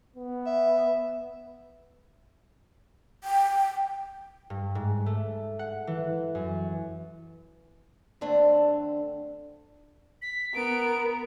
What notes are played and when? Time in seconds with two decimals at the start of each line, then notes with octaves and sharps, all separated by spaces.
0.16 B3
0.46 E5
3.24 G5
4.50 G2
4.75 G#2
5.06 A3
5.59 F#5
5.87 E3
6.35 F#2
8.21 D3 A3 C4 D4 F#5
10.22 B6
10.55 B3 A#4 D7